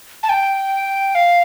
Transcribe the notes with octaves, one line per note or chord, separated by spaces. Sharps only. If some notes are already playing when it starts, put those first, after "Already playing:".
A5
G5
F5